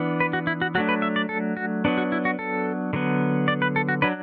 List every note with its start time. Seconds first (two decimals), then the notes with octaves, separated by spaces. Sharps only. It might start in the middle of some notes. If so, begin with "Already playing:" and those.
Already playing: E3 B3 D4
0.20 B4
0.33 F#4
0.47 E4
0.62 F#4
0.75 F#3 A3 D4 F#4
0.89 B4
1.02 E5
1.16 D5
1.29 A4
1.57 F#4
1.85 F#3 B3 D4
1.98 F#4
2.12 E4
2.25 F#4
2.39 A4
2.93 D3 F#3 B3
3.48 D5
3.62 B4
3.76 A4
3.89 F#4
4.02 F#3 D4 B4